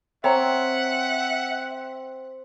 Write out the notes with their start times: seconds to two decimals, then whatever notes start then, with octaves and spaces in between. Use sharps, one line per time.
0.24 C4 C#5 E5 F#5 A#5